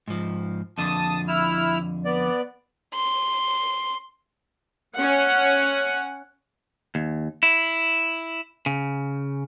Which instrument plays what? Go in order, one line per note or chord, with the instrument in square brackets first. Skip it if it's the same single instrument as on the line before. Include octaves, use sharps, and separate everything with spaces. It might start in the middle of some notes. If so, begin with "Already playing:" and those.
[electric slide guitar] G#2 F3
[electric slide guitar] F2 D3 [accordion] A5 D#6
[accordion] E4 E6 F6
B3 D5
[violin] C6
[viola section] C#4 F#5
[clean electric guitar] D#2
E4
C#3